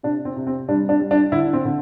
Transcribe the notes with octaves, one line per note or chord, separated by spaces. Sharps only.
C3 D4
C4
C3
C4
G3 D4
D4
G3
D4
D3 E4
C4
D3